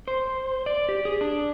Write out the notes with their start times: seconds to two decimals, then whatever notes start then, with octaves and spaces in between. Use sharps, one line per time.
0.08 C5
0.66 D5
0.89 G4
1.05 G#4
1.21 D4